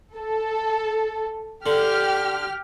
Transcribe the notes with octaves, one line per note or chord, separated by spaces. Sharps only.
A4
D3 G4 F6